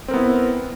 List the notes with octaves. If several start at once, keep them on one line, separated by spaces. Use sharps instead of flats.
B3 C4 E4 A#4